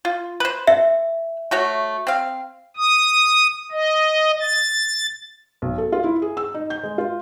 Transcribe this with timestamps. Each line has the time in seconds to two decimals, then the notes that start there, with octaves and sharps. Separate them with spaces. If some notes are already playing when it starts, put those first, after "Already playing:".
0.05 F4
0.40 B4 C5
0.67 E5
1.51 A3 F#4 C#5
2.07 C4 F5
2.77 D#6
3.72 D#5
4.40 A6
5.62 B1
5.78 A4
5.92 F4
6.04 E4
6.22 G#4
6.37 E6
6.54 D#4
6.70 G6
6.83 G#3
6.98 F4